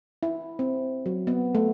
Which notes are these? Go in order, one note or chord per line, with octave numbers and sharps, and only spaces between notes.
E4
C4
F#3
B3
A3